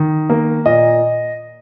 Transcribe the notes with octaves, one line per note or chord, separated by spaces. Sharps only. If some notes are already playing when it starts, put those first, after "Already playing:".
Already playing: D#3
A#3
A#2 D#5